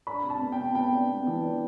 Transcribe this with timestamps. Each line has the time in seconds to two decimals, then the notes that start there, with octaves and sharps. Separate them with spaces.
0.07 D4 B5
0.24 C3
0.30 A5
0.40 B3
0.52 G5
0.58 C3
0.75 B3 G5
0.92 D4
1.10 B3
1.27 E3
1.44 D4